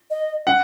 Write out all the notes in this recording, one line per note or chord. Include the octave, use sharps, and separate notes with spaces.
D#5
F#5